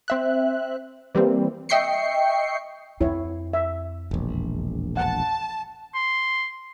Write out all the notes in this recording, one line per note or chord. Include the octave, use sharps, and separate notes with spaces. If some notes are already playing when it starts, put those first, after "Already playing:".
C4 E5 F#6
E3 G3 A#3 C4
D#5 E5 G5 C#6 C7 C#7
F2 C4 E4 C#5
E5
E1 A#1
F#5 A5
C6